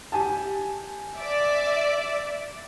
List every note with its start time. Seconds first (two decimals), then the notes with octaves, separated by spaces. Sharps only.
0.12 G4 G#5 A5
1.16 D5 E5